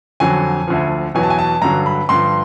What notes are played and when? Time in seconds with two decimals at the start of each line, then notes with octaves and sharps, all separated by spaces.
0.20 F2 D3 F#3 G#5
0.68 D2 D3 F3
1.15 E2 B2 F#3 G#5
1.23 A5
1.30 G#5
1.39 A5
1.62 G2 D3 F#3 A#5
1.86 B5
2.09 G2 D3 F3 C6